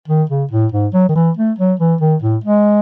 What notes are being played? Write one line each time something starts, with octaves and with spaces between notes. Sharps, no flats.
D#3
C#3
A2
G#2
F#3
D#3
E3
A3
F#3
E3
D#3
A2
G#3